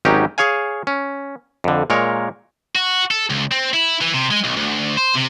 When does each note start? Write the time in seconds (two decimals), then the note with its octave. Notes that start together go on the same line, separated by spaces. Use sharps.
0.05 G#1 F#3 C#4 D#4 G4
0.38 G#4 C#5 F5 G#5
0.87 C#4
1.64 F2 D3
1.90 A#2 G#3 A#4 C#5
2.75 F#4
3.11 A4
3.30 C#2
3.52 C4
3.74 E4
4.01 E3
4.14 C3
4.31 G#3
4.44 B1
4.57 D2
4.97 C5
5.15 C3